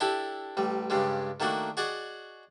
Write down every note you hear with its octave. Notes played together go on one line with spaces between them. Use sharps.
D4 E4 G4 A4 A5
A1 G3
G2 C#3 G3 G#3
D#3 A3 A#3 D4 F#4
F#4 G#4 D5 D#5 F#5